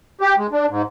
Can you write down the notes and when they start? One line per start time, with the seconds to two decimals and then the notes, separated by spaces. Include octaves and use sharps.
0.21 G4
0.38 G#3
0.52 D4
0.69 G#2